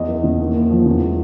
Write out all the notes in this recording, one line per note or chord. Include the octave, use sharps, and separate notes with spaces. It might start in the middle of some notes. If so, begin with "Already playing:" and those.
Already playing: E2 D#5
E3
E2
D#2
D#2
F3
E2
G#3